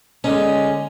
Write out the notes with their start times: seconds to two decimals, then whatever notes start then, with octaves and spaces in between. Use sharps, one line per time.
0.24 D3 G#3 C#4 D#4